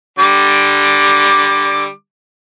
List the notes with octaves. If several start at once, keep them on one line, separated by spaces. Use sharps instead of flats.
D3 G3 D6